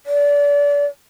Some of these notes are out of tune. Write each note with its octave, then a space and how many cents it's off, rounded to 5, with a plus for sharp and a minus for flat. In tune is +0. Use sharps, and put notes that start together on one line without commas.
D5 -30